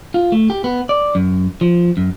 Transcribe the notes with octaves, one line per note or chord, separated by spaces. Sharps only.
F4
A3
G4
B3
D5
F#2
F3
F#2